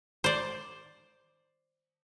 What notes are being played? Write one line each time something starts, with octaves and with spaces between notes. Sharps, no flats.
C5 D5